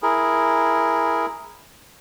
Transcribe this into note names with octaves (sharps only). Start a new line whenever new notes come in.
E4 G#4 A#4